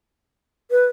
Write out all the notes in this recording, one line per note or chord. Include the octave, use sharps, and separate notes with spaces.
B4